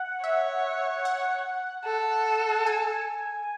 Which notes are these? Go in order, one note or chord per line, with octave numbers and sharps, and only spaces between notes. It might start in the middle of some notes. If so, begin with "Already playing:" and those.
Already playing: F#5
C#5 E5
F#5
A4
G#5